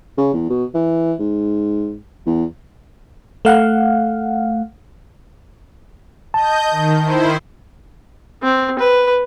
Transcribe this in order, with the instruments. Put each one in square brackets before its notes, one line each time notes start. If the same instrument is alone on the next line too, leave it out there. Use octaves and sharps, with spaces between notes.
[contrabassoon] C#3
E2
B2
E3
G#2
E2
[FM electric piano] A3 F5 F#5
[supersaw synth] D#5 G6 [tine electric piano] A5
[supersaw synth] D#3
D#3 E4 C5
[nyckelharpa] C4
B4